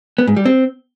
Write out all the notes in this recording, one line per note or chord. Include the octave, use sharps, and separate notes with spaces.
B3
G#2
G3
C4